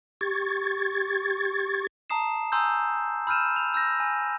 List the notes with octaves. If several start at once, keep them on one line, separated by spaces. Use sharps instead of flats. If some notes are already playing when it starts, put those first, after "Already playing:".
G4 C#6 G#6 A6
A5 A#5 D#6 C7 E7
G#5 A#5 C6 D#6 E6 G6
B5 E6 F6 G6 D#7 E7
F7
E6 G6 A#6
G#5